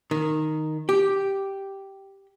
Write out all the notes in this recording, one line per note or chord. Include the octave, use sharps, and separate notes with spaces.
D#3
G4